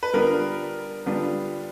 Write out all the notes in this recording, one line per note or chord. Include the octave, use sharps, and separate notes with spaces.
B4
D3 G3 B3 D4 F4 A#4
D3 G3 B3 D4 F4